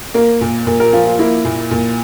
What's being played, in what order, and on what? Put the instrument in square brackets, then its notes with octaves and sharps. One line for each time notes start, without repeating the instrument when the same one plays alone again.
[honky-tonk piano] A#3 [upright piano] A#4
[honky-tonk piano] A#2
[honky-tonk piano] A#2 [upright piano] A#4
[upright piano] A#4
[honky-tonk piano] F3 [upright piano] F4
[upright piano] F4
[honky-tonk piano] A#3 [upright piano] E4
[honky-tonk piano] A#2
A#2